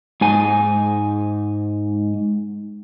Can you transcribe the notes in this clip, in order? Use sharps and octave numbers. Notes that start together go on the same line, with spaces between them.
G#2 G#5